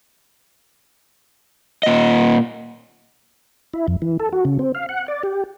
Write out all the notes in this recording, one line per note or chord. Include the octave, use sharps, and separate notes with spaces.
A#2 D#5
E4
F2
E3
A4
F#4
C#3
C4
F5
F#5
D5
G4